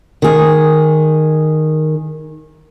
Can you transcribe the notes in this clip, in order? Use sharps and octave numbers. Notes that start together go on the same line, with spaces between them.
D#3 G#4